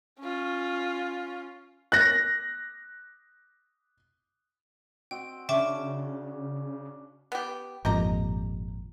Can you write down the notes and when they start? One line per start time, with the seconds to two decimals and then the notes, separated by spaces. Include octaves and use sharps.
0.20 C#4 F4
1.92 F#6 A#6
5.11 C4 F#4 D#5 G5
5.49 C#3 C#4 D4 E5 G5 C#6 D6
7.32 B3 G4
7.85 G#1 F2 A#2 G4 D#5 A#5